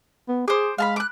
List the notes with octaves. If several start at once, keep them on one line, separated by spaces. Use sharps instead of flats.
B3
G#4 C5 D6
G#3 F5 A5 B5
D6 F#6